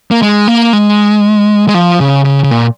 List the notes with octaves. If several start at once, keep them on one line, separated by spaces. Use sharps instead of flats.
A#3
G#3
A#3
G#3
G#3
F3
C#3
C#3
C#3
A#2